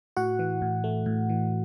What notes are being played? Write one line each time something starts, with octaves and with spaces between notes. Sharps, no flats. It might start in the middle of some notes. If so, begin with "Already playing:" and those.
A2 F#4 F#5
E3
A2
A3
A2
E3